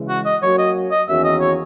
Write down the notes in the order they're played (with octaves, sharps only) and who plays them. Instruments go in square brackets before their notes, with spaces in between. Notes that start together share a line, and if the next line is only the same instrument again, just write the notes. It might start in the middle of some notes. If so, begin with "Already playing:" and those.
Already playing: [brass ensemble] C#3 E3 G#3
[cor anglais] F#4
D#5
[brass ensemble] F#3 A#3 C#4 F#4 [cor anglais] C#5
[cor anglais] D#5
D#5
[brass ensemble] E2 D#3 A#3 C#4 F#4 [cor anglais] E5
[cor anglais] D#5
C#5